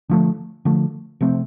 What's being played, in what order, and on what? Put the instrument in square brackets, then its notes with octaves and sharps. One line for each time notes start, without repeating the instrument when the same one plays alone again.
[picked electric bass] D3 F3 A3
D3 F3 A3
C3 F3 A3 C4